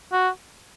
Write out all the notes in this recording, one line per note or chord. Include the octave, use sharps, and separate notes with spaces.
F#4